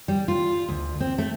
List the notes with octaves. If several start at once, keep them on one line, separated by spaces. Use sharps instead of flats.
G3
F4
D2
C4
A3